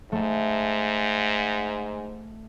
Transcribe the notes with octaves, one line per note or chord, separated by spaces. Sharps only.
G#2 A3